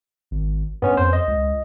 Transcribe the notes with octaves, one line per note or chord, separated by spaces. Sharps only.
G#1
G2 B3 C#4
F2 C5
D#5
C#2